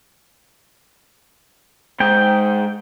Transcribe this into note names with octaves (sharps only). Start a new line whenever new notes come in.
G#2 G5